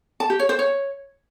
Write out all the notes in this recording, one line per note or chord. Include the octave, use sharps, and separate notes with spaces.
A5
G4
C#5
C5
C#5